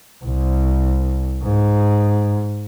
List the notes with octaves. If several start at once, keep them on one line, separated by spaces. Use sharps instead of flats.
C2
G#2